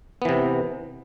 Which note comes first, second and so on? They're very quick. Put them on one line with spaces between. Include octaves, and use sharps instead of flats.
B3 E3 C3